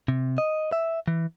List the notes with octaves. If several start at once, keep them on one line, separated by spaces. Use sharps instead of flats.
C3
D#5
E5
E3